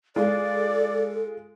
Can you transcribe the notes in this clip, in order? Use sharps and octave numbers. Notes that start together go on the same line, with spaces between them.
G#3 F4 A4 D5